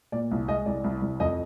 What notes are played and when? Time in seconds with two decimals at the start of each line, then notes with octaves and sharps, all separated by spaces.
0.12 A#2 D5
0.31 C2
0.48 G#3 D#5
0.66 C2 D5
0.84 C2
1.02 C2
1.20 F2 D#5